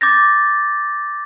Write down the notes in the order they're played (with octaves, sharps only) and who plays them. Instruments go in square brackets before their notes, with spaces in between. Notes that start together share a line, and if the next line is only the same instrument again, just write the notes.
[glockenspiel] D6 G6 A6 A#6